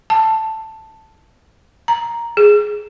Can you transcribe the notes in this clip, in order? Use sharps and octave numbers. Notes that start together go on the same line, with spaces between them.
A5
A#5
G#4